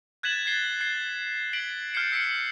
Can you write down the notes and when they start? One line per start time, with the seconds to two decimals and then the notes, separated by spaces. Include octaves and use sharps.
0.23 F#6 G#6 A6 B6 E7 F#7
0.46 G#6 A6 B6 C7 G7
0.81 G#6 C7 G7
1.53 G#6 B6 D7 F#7 G7
1.93 F6 G6 A6 C7 C#7 E7
2.12 E6 B6 C#7 D7 G7